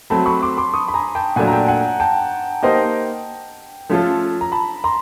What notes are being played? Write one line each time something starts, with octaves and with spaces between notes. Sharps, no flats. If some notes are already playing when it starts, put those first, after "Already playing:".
F#3 A3 C4 A5 B5
B5 C#6
C6 D6
C6 D6
C#6 D#6
B5
G#5 A#5
G5 A5
A#2 F#3 A3 D4 F#5 G#5
A#5
G5 A5
F#5 G#5
G5 A5
A#3 D#4 G4 C5 D#5
F3 A3 C#4 F4 A4
A#5
A5 B5
A#5 C6